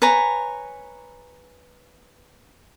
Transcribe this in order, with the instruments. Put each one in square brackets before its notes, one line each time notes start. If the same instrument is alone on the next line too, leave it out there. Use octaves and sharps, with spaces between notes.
[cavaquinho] B4 C#5 G#5 A#5